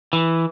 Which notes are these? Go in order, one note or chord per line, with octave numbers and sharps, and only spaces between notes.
E3